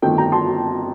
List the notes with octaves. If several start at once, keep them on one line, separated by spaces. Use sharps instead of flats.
G1 F2 D#3 A3 G5
G5 A#5
A5 C6